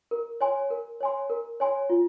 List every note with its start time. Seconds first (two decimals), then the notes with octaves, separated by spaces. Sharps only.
0.11 A#4
0.41 C#5 G#5 C6
0.70 A#4
1.00 C#5 G#5 C6
1.30 A#4
1.60 C#5 G#5 C6
1.90 F4